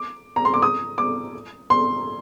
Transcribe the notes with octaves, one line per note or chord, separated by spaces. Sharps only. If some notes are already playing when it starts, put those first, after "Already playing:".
Already playing: D6
A#5
C6
D6
D#6
D6
C6